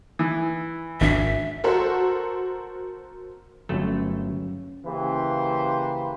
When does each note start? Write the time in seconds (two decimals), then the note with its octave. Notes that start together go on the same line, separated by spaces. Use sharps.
0.19 E3
1.01 G#1 D4 E5
1.64 F#4 A4 A#4 C5 F#5
3.69 G1 F#3 A3 C#4 A4
4.86 C#3 E3 A#3 G4 B4 C5